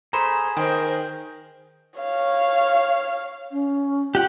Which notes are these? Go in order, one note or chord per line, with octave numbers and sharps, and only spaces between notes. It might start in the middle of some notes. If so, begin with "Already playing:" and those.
A3 G#4 C5 A#5 B5
D#3 A#4 C5 G5
C#5 F5
C#4
F4 G4 F#5 G5